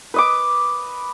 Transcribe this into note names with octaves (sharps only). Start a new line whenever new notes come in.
B4 D#5 D6